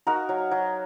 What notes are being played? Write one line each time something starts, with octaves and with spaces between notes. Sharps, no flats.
D#4 F#4 A#4
F#3
F#3